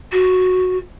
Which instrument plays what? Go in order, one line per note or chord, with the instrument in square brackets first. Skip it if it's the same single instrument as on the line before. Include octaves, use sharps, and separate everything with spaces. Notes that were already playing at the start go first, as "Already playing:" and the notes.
[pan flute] F#4